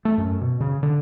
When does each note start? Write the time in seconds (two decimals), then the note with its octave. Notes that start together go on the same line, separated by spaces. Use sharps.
0.05 A3
0.18 F#2
0.41 B2
0.60 C#3
0.83 D3